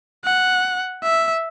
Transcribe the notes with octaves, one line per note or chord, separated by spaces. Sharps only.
F#5
E5